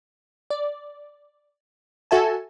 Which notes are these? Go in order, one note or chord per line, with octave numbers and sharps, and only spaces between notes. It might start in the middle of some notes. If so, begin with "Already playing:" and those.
D5
F#4 A4 E5 G#5 A5